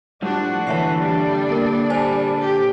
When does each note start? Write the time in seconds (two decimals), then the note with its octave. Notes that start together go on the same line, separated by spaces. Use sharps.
0.22 A2 F3 G3 D4 F#4
0.67 A#2 D3 E3 A4 C#5 E5 C7
0.99 G3 D4 D5
1.50 A#3 A#4
1.90 G3 C5 G#5 A5
2.40 G4